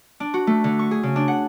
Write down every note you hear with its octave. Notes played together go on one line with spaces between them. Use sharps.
D4
F#4
A3
D3
C#6
G#4
C#3
D4
F#5